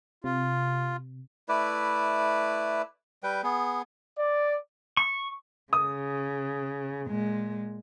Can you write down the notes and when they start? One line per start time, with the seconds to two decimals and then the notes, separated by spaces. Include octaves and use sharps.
0.24 C3 F4
1.49 A3 E4 B4 D5
3.23 G3 B4 G5
3.43 B3 G#4
4.19 D5
4.97 C#6
5.73 C#3 D#6
7.08 A#2 G#3